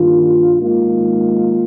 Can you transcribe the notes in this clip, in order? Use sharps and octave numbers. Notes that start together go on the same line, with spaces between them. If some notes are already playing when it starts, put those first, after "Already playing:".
Already playing: G2 D#3 G3 A#3 F4
G#2 D#3 A#3 F4